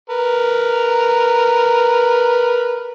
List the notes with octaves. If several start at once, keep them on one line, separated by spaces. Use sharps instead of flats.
A#4 B4